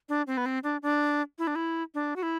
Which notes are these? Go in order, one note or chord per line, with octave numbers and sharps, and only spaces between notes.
D4
C4
B3
C4
D4
D4
E4
D4
E4
D4
F#4
E4